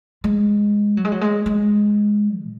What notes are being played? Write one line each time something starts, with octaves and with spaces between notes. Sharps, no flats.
G#3
F#3
G#3
F#3
G#3
G#3
A#2